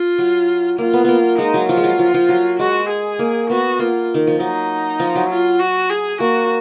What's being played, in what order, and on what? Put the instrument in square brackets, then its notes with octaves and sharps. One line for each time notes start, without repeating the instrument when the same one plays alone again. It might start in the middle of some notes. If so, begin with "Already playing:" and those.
Already playing: [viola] F4
[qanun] F#3
[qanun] A#3 [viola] F4
[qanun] B3
A#3 B3
[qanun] G#3 [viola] D#4
[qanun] F#3
[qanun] F3 [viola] F4
[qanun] G#3
F#3
F3
F3
F#3
[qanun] G#3 [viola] F#4
[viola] G#4
[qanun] A#3
[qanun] B3 [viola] F#4
[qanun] A#3 [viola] F4
[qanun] D#3
F3
[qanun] F#3 [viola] D#4
[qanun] F3
F#3
[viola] F4
F#4
G#4
[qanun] A#3 [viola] F#4